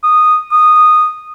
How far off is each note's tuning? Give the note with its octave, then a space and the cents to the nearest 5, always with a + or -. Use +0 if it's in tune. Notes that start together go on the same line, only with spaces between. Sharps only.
D#6 -10
D#6 -10